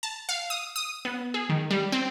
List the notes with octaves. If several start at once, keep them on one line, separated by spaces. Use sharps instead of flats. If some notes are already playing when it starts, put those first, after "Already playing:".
A5
F5
D#6
D#6
B3
G#4
D#3
G3
C4